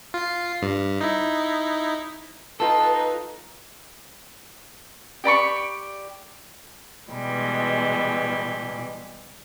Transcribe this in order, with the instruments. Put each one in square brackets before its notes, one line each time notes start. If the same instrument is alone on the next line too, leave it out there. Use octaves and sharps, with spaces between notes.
[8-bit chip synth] F4 C7
G2
D#4 E4
[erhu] D#4 [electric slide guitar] F4 A4 [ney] B4
[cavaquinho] G4 D5 B5 C#6
[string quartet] B2 E3 G3 G#3